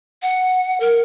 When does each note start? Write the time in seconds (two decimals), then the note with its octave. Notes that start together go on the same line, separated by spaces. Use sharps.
0.22 F#5
0.80 A#4